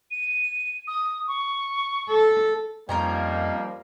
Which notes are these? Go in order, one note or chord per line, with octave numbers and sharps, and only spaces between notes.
D#7
D#6
C#6
A4
F2 F3 G3 A#3 C#4 D#4 A#4